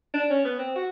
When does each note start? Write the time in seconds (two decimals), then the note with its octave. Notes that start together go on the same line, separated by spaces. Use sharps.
0.14 D4
0.30 C#4
0.45 B3
0.59 C4
0.75 F#4